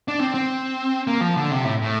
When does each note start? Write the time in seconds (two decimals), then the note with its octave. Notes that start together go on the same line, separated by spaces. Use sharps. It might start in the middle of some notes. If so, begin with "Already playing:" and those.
0.08 D4
0.20 C4
0.34 C4
1.07 A#3
1.21 F3
1.36 D3
1.51 C3
1.64 A2
1.82 A2